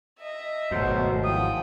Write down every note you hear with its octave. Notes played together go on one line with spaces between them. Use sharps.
D#5 E5
G#1 D#2 B2 F#3 A3 C5
E3 F3 F#5 G5 D#6